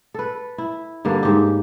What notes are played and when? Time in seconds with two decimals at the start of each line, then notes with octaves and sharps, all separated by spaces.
0.14 A4 B4
0.58 E4
1.05 G2 D3 A#3 B4
1.23 G#2 G4